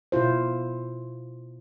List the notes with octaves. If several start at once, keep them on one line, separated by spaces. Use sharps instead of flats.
B2 E4 F4 C5